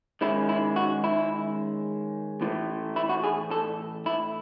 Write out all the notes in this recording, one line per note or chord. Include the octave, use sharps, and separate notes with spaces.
D#3 G#3 C#4 E4
E4
F#4
E4
A2 E3 A3
E4
F#4
G#4
A4
E4